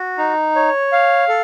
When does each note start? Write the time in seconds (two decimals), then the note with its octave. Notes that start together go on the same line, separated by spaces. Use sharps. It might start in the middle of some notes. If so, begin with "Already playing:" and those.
Already playing: F#4
0.18 D#4
0.56 C#5
0.92 F5
1.28 A4